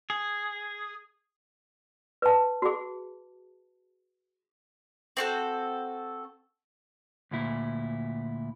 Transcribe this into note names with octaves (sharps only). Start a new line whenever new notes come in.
G#4
B4 A5
F#4 G#4
C4 F#4 A4
D2 A#2 E4